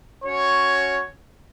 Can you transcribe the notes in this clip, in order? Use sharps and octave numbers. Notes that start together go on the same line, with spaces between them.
C#4 F#4 C#5